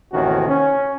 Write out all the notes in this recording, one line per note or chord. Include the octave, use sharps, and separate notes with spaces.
A1 D#2 C3 D#3 C#4 F#4
C#4